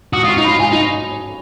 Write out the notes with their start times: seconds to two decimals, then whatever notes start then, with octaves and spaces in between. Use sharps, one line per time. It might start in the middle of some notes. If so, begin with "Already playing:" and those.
0.13 F#4 D#6
0.23 F4 D#6
0.29 C#6
0.37 D#4
0.44 F4 B5
0.60 F4 G#5
0.72 D#4